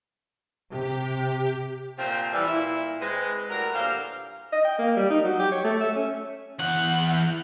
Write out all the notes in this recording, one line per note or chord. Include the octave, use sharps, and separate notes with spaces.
C3 G4
A#2 F3 A3 C4
E3 G3
A#2 E4
G#3 C4 B4
A2 F#3 G3 A#4
A#2 D3 E3 G3 C5 F5
D#5
G5
A#3
G3
D#4
F#3
G4
C#5
A3
E5
C#4
E2 F#5